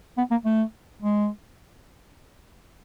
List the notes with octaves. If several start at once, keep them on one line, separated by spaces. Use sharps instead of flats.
B3
A#3
A3
G#3